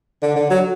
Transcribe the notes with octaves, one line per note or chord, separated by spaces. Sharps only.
D3
D3
F#3